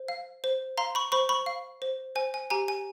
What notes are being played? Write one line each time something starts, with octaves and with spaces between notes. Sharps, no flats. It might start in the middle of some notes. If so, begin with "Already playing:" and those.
Already playing: C5
F5
C5
F5 A#5 C6
B5 C#6
C5 B5 C#6
B5 C#6
F5
C5
C5 G#5
G#5
G4 G#5 A#5
G#5